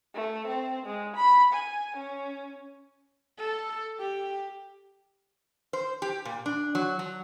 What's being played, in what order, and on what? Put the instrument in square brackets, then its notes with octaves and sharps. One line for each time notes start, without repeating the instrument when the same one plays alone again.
[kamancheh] A3
C4
G#3
B5
G#5
C#4
[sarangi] A4
G4
[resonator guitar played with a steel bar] C5
G4
A#2
D4
F#3
F#3